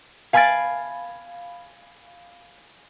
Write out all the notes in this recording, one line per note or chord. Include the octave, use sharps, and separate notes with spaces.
F5 G#5 B5 F6 A6 D7